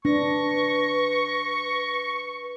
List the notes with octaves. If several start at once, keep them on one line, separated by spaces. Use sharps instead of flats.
D4 B4 C#6 A#6